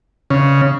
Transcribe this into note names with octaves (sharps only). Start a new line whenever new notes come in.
C#3